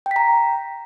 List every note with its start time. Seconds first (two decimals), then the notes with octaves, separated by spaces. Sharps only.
0.06 G5
0.11 B6
0.16 A#5